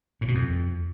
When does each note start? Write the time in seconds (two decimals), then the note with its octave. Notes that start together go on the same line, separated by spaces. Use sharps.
0.21 A2
0.28 B2
0.35 F2